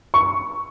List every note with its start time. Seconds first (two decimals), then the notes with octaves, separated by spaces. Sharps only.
0.14 C#6